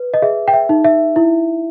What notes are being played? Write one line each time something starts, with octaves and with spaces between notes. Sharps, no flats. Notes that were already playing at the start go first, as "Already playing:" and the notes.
Already playing: B4
D#5
G#4 E5
G5
E5
D#4
E5
E4